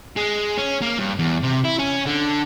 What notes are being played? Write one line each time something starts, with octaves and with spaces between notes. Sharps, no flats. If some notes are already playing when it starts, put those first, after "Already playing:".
G#3
C#4
A#3
G2
E2
C3
E4
C#4
D3